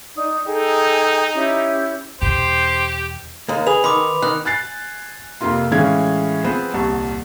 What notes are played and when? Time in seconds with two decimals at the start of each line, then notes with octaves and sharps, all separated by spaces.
0.15 D#4 D5 D#6
0.46 D#4 G#4 A4 G5
1.34 C#4 E4 G4
2.22 E2 B2 G4 C5
3.48 D#2 A#3
3.67 G#4 B4 F7
3.84 D#3 B5 C6 D6
4.22 D#3 F#6
4.45 G#5 F#6 A6 C7
5.41 F2 C3 A#3 F4 C6
5.71 A2 E3 G#3 C#4 F5 G#6
6.44 F3 B3 C4 G#4 B4 C5
6.73 D#1 C2 A5 C#6